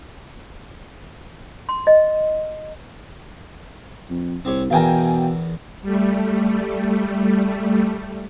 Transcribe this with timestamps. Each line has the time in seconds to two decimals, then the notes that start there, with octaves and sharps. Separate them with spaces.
1.69 C6
1.87 D#5
4.10 F2
4.45 C2 C4 G4 C#5
4.70 E2 B2 E3 A#4 F5 G5 G#5
5.82 G3 A3